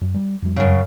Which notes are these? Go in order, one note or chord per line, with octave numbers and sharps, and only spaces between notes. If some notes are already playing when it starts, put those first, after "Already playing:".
F#2
G3
F2 G3
F#2 C#3